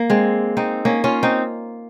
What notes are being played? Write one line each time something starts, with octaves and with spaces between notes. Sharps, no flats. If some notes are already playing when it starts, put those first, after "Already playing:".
Already playing: A#3
G#3 C4
C4 D#4
A#3 C#4
C#4 F4
C4 D#4